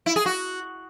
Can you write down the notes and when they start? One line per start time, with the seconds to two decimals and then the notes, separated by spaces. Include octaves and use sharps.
0.06 E4
0.16 G#4
0.26 F#4